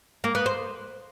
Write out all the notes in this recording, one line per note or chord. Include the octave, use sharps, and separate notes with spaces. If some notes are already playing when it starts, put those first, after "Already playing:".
A#3
B3
C5